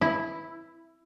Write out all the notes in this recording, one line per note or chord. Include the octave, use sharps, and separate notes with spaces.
E4